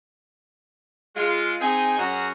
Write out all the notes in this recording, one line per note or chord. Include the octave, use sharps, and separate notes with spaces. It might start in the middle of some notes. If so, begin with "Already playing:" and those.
G#3 F4
C4 D#4 G#4 D#5 G#5
F#2 C#4 F#4 G#4 A#5